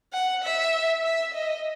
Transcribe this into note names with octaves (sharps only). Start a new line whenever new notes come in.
F#5
E5
E5
D#5